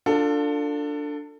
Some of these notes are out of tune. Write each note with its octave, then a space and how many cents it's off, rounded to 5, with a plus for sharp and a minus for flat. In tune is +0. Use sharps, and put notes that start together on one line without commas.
D4 +0 F4 +20 A4 +25